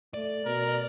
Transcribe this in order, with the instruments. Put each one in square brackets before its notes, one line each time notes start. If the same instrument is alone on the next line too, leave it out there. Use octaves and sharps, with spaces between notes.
[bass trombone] A3 [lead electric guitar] D5
[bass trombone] B2 [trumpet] A#4